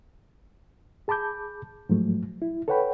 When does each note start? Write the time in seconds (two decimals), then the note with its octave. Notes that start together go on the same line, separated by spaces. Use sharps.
1.08 G#4 A5 B5 D6 G6
1.89 G#2 F3 F#3 A3
2.42 E4
2.68 A4 B4 C#5 F#5 G5 B5